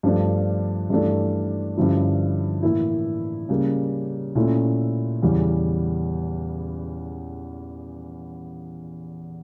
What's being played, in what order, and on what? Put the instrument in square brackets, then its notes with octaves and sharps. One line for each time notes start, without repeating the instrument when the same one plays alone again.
[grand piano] G2 F3 A3 D4
G2 E3 A3 D4
G2 D3 F3 C#4 E4
A2 E3 A#3 E4
C#3 G3 A#3
A#2 A3 C#4 E4
E2 C#3 E3 G3 C#4